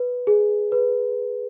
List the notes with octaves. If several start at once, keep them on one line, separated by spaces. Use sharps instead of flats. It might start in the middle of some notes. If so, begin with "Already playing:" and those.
Already playing: B4
G#4
B4